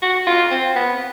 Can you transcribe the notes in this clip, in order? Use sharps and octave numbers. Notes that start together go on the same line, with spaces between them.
F#4
F4
C4
B3